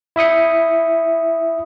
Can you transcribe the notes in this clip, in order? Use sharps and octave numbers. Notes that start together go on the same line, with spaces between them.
E4 E5 D#6 C#7